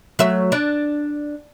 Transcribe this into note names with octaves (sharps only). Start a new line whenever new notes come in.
F#3 A3 E5
D4